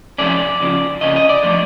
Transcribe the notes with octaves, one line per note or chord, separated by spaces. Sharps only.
C3 F3 A3 C#4 D5
F2 C#3 F3
C#3 F3 A#3 C#4 D#5
D#5
D5
D3 F3 A3